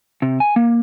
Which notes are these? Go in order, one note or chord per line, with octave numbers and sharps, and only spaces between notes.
C3
G#5
A#3